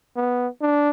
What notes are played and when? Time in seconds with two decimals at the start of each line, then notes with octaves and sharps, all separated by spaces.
0.16 B3
0.61 D4